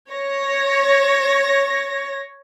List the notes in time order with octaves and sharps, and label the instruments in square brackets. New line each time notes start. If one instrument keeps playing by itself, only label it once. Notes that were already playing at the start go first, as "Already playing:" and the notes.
[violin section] C#5 A#6